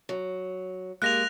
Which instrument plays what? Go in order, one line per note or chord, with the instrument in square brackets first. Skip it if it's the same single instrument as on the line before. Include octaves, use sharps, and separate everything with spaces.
[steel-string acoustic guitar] F#3
[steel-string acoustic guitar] G#3 A#3 G4 [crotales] F#6 A#6 F7